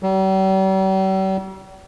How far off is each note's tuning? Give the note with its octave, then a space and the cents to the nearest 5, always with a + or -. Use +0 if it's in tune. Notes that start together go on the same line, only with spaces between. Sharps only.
G3 -45